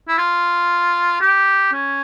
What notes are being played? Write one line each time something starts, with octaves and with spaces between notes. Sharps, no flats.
E4
F4
G4
C#4